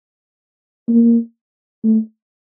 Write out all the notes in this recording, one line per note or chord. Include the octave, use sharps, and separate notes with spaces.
A#3
A3